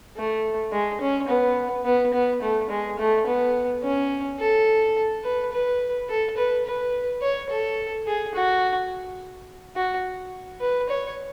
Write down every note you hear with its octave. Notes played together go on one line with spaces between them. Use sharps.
A3
G#3
C#4
B3
B3
B3
A3
G#3
A3
B3
C#4
A4
B4
B4
A4
B4
B4
C#5
A4
G#4
F#4
F#4
B4
C#5